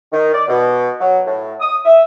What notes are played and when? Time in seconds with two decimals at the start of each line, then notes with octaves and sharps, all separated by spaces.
0.12 D#3
0.33 D5
0.48 B2
1.00 F#3
1.26 A2
1.60 D#6
1.84 E5